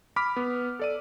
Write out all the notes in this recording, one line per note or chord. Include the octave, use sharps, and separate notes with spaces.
B5 D6 F6 B6
B3
A4 D5 D#7